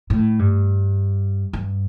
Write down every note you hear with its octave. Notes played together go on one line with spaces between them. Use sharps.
A2
G2
G2